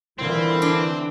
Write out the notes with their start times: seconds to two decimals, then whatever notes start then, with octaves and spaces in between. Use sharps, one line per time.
0.19 A#2 D3 E3 G3 C4 E4
0.62 D4